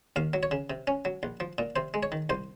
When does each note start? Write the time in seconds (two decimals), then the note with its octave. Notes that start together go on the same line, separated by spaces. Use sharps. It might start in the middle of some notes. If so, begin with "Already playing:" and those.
0.16 D#2 F5
0.33 F#3
0.43 C#5
0.51 C#3
0.70 C3
0.87 C#4
1.05 F#3
1.23 A#1
1.40 F3
1.58 A#2
1.76 C3 C5
1.94 G#3
2.03 C#5
2.12 D#3
2.30 C2 C5